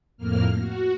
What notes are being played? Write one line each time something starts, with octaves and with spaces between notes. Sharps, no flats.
F2 A2 A#3 F6
F#4